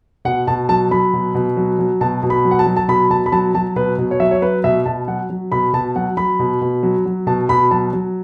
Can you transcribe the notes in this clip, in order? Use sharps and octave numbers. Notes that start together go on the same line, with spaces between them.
B2 F#5
B2 A5
F#3 A5
F#3 B5
B2
B2
F#3
F#3
B2 A5
B2
B5
F#3
F#5
A5
F#3
A5
B2 B5
B2 A5
B5
F#3 A5
F#3 A5
B2 B4
B2
C#5
F#3 E5
C#5
F#3 B4
B2 E5
B2 A5
F#3 F#5
F#3
B2 B5
B2 A5
F#3 F#5
F#3 B5
B2
B2
F#3
F#3
B2 A5
B2 B5
F#3 A5
F#3